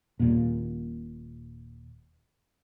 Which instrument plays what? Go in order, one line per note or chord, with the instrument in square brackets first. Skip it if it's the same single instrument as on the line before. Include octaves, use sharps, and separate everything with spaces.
[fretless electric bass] D#1 D#2 A#2